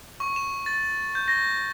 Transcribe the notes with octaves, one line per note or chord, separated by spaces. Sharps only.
C#6
E7
A6
G6
A#6